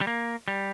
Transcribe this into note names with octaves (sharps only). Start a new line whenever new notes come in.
G3
A#3
G3